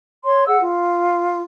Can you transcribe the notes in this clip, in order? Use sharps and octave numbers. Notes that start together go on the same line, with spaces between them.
C#5 C6
G#4 F#5 E6
F4